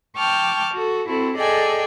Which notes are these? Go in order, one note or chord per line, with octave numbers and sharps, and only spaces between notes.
G5 A5 C#6 D6 F6 G6
F#4 A4
C4 E4 F#4 A4
G#4 A4 D5 D#5 G5 G#5